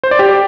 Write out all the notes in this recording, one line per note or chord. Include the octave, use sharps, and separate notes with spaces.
C5
D5
G4